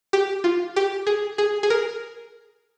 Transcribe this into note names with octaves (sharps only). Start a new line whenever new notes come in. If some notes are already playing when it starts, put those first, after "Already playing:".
G4
F4
G4
G#4
G#4
G#4
A#4